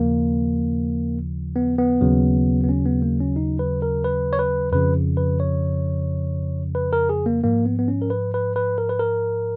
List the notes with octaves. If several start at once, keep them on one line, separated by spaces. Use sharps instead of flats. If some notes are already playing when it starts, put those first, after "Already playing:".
Already playing: D#2 C#3 F3 A#3
B3
B3
D#2 C#3 F#3
B3
C#4
B3
A#3
C#4
D#4
B4
A#4
B4
C#5
B4
F2 C#3 F3 B4
B4
C#5
B4
A#4
G#4
A#3
G#2 F3 A#3
B3
B3
C#4
A#4
B4
B4
B4
A#4
B4
A#4